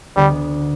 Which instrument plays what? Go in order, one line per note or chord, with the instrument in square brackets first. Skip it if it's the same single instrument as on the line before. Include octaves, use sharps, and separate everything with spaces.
[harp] D2 D3 B3 D4 B4 [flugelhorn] G3